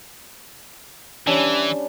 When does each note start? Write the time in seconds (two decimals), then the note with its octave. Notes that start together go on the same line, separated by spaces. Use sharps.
1.27 E3 G3 C#4 D4